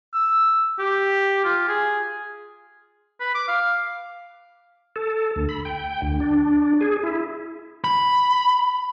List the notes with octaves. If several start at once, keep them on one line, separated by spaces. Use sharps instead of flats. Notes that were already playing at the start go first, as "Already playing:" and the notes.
E6
G4
F4
G#4
B4
D6
F5
A4
D2
B5
G5
D2
D4
G#4
E4
B5